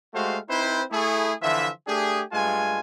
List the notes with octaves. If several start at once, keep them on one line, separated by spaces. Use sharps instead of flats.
G#3 A3 F#4 G4 C5 F5
C4 D#4 E4 B4 C5
A3 E4 G#4
D3 E3 F3 F4 E5
A3 D4 G4 G#4
G2 G#3 A3 F4 G#5